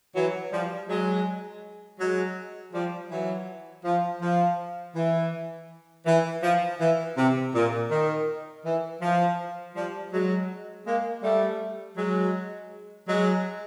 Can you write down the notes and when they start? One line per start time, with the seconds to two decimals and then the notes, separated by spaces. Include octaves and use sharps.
0.15 E3 F#3
0.51 F3 G3
0.88 F#3 G#3
1.99 F#3 G#3
2.73 F3 G3
3.10 E3 F#3
3.85 F3
4.21 F3
4.95 E3
6.06 E3
6.42 F3
6.79 E3
7.16 C3
7.54 A#2
7.90 D#3
8.64 E3
9.02 F3
9.75 F3 G3
10.12 F#3 G#3
10.86 G#3 A#3
11.23 G3 A3
11.97 F#3 G#3
13.08 F#3 G#3